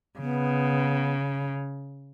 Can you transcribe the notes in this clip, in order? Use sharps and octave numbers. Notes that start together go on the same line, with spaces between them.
C#3 B3